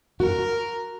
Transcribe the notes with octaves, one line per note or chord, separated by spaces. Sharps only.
F#4 A#4